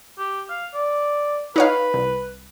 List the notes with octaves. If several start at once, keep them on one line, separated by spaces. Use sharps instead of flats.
G4
F5
D5
D#4 B4 C#5 F5
C2